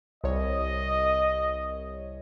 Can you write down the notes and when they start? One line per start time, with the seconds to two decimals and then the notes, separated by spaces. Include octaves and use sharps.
0.24 C2 C#5 D#5